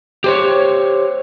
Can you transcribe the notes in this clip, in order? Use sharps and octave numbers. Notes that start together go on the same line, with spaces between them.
G4 C5 C#5